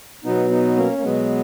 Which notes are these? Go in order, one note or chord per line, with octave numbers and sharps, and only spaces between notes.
B2 F#3 B3 D#4
B3 D#4
A#3 C#4
A#3
B2 F#3 G#3 B3